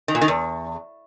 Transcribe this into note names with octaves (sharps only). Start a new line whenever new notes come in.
D#3
A#2
D#3
E2